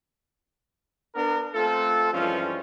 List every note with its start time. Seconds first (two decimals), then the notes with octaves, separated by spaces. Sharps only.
1.15 B3 D4 A#4
1.54 A3 C4 F4 A4
2.12 G2 E3 F3 G#3 C#4 F4